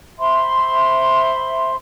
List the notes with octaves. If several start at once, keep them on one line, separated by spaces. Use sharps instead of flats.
C5 E5 B5 C6